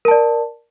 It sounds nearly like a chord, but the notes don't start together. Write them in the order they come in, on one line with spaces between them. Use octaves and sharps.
A#4 A5 D5